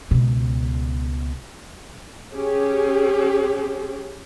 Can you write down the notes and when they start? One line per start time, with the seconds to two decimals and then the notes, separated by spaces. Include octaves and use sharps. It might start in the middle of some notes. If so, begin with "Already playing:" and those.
0.11 C#2 B2
2.33 C#4 G4 G#4